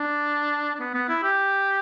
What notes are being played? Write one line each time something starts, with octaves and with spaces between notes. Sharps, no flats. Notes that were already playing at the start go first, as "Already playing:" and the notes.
Already playing: D4
D4
B3
B3
E4
G4